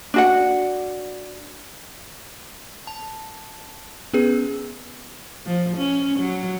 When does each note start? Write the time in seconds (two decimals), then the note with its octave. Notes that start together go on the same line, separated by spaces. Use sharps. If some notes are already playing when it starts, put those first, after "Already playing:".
0.14 D4 F#4 F#5
2.87 A5
4.13 B3 C#4 G#4 B4
5.46 F3
5.78 C#4
6.19 F#3